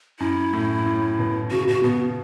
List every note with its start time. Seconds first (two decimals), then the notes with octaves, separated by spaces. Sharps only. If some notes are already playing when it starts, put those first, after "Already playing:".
0.20 F#2 E4
0.53 A2
0.86 A2
1.19 B2
1.51 C#3 F#4
1.67 B2 F#4
1.84 B2 B3